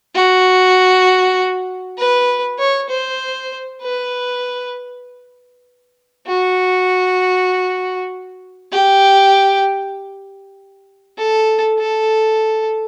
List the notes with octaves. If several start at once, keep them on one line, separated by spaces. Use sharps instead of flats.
F#4
B4
C#5
C5
B4
F#4
G4
A4
A4